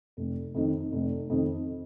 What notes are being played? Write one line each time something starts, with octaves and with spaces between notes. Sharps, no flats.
F1
F2 D#3
F1
F2 D#3